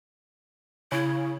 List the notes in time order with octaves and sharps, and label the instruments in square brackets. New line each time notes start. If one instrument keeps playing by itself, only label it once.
[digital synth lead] C#3 [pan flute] E4